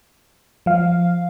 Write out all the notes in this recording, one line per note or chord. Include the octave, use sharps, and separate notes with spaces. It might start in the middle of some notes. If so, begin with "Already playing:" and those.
F3 F5